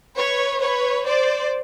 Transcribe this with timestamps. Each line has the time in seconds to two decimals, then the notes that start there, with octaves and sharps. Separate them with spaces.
0.16 B4 C#5
0.61 B4 C#5
1.06 C5 D5